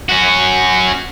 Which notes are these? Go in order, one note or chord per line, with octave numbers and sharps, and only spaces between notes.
C#4 F#4